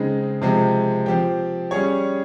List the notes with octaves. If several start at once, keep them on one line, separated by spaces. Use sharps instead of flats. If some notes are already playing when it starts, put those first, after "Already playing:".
Already playing: C#3 G#3 C4 D#4
C3 F3 G#3 C4
F3 C4 G4
G3 C#4 G#4 C#5